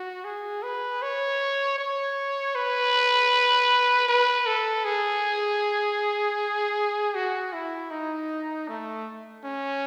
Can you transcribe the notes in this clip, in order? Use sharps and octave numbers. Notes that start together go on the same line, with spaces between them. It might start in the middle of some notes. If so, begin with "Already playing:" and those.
Already playing: F#4
G#4
B4
C#5
C#5
B4
B4
A4
G#4
F#4
E4
D#4
A3
C#4